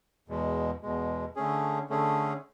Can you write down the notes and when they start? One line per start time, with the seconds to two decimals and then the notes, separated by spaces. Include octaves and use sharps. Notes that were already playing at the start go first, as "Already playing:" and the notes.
0.28 E2 B2 G#3
0.82 E2 B2 G#3
1.36 D3 A3 C#4 G#4
1.90 D3 A3 C#4 G#4